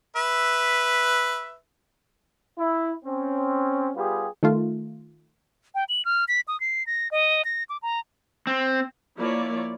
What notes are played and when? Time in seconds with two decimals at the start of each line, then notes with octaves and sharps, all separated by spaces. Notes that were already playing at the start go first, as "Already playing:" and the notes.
0.16 B4 E5
2.58 E4
3.05 C4 C#4
3.96 G3 B3 F4 G4 G#4
4.43 D#3 A3 F4
5.75 G5
5.89 F#7
6.05 F6
6.28 B6
6.48 D#6
6.60 C7
6.87 A#6
7.11 D#5
7.45 A#6
7.69 D6
7.82 A#5
8.47 C4
9.18 F3 A#3 E4 C#5 D5